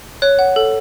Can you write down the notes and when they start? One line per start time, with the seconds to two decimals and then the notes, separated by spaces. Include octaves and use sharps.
0.22 C#5 F#6
0.39 F#5
0.56 A4